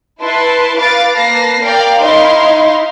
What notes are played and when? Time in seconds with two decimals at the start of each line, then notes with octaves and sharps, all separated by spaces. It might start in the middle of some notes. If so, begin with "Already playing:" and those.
0.20 E4 B4 A5 C6
0.77 B4 F5 D6 A6
1.15 A#3 B4 A5 A#6 C7
1.61 A#4 D5 F5 G5
2.00 D#4 E4 D#5 F5 C6